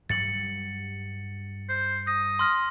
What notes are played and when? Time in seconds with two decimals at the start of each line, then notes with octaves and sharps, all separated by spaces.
0.10 G2 F#3 G3 A6 C#7 F#7
1.69 C5
2.07 D#6 A#6
2.39 C6 F6 A#6